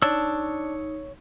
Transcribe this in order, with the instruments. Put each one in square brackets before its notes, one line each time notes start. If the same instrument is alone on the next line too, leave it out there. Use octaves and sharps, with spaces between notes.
[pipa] D4 [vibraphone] D#4 [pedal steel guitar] C#5 E6